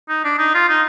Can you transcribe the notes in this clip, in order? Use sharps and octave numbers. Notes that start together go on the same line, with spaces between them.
D#4
D4
D#4
F4
D#4